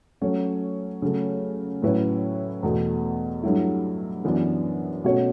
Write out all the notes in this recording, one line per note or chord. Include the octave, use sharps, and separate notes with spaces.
F#3 A3 C#4
C#3 F#3 A3
A2 F#3 C#4 E4 B4
E2 B2 A3
G2 F#3 A3 E4
F#2 E3 B3 D4
B2 A3 C#4 F#4 C#5